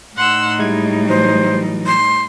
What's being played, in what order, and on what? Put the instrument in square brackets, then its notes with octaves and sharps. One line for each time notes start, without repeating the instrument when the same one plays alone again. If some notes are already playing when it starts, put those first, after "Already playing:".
[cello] A2 D#4 [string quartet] F#5 C6 E6
[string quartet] G3 [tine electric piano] G#3 E4 G#6
[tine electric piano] E3 F#3 [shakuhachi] C5
[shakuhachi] C6